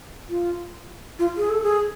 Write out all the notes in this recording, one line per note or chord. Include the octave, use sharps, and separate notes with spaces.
F4
F4
G#4
A4
G#4